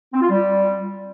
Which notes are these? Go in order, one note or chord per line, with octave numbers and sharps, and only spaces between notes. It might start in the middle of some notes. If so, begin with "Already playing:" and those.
C4
F4
G3